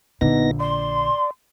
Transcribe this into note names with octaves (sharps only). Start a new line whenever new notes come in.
A#1 D3 B3 D#4 A#6
D5 C6